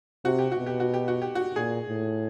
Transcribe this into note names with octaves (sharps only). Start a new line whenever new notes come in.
C3 F#4
G4
F#4
B2
G4
F#4
G4
F#4
G4
F#4
A#2 G#4
A2